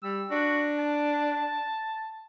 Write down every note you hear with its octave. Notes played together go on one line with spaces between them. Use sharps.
G3 E6
D4 F#4
A5